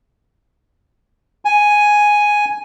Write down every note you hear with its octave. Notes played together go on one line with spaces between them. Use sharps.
G#5